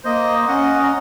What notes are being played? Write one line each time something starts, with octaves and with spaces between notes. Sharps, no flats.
A#3 C5 D#5
C#4 D#5 F#5
A#5